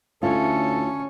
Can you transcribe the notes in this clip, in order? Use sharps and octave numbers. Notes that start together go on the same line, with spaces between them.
D2 C#4 E4 F4 A4